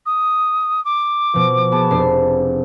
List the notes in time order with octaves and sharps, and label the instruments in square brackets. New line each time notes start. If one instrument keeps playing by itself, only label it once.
[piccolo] D#6
D6
[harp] B2 F3
B3 G#4 A5
F1 D4 C7